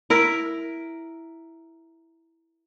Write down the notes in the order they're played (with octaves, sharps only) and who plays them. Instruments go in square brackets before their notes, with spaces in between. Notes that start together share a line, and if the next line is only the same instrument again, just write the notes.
[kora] E4 A#4